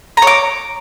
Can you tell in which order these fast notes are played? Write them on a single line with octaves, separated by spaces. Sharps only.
A#5 C#5 D6